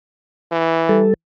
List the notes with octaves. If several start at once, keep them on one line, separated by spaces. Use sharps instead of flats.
E3
G3 A4